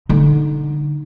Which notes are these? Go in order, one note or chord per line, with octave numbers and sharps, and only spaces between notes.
D3 D#4